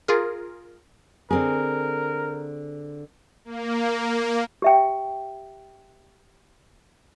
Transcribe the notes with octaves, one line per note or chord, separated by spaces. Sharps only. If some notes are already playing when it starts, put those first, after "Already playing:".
F4 G#4 A#4
D3 C4 G#4 A#4
A#3
G4 E5 G5